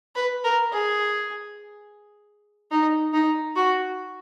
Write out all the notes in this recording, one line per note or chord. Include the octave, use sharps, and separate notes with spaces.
B4
A#4
G#4
D#4
D#4
F#4